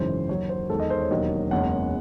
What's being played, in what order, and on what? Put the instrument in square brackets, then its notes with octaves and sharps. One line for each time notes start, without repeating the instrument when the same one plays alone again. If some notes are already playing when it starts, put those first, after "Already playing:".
Already playing: [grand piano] G#1 F#2 C#3 E3 G#3 C5
D#2 D#3 F#3 C#5
C5
E2 D#3 G#3 A4
D#5
C5
C#5
E1 D#2 D#3 F#3 D#5
F#1 E2 C#3 G#3 F#5